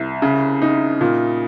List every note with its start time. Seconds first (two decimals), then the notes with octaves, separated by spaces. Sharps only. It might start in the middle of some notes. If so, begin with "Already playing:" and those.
Already playing: C2
0.22 C#3
0.62 D#4
1.01 A#2